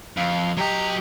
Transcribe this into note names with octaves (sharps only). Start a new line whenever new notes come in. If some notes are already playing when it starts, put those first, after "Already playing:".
F2 F5
F#3 G4 D#5 A#5